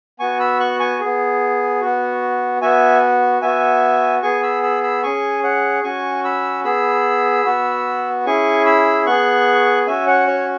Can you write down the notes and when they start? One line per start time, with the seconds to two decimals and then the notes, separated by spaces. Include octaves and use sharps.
0.20 B3 F#4 G#5 C#6
0.40 B5 E6
0.60 C#6 F#6
0.80 G#5 C#6
1.00 B3 G#4
1.81 B3 F#4
2.62 B3 F#4 E5 G#5
3.42 B3 F#4 E5 G#5
4.23 B3 G#4 G#5 C#6
4.43 B5 E6
4.63 B5 E6
4.83 B5 E6
5.03 C#4 G#4 G#5 C#6
5.43 C#5 F#5
5.84 C#4 F#4 G#5 C#6
6.24 B5 E6
6.64 B3 G#4 B5 E6
7.45 B3 F#4
8.26 C#4 E4 G#4 G#5 C#6
8.66 B5 E6
9.06 B3 G#4 C#6 F#6
9.87 C#4 F#4 E5 G#5
10.07 C#5 F#5
10.27 C#5